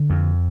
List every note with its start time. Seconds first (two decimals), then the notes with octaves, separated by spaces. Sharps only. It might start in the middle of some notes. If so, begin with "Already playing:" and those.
Already playing: D3
0.10 F2